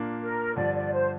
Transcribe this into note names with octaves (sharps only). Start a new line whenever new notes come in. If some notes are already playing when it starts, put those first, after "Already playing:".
Already playing: A#2 A#3 D4
A#4
G2 D3 F3 D5
D5
C5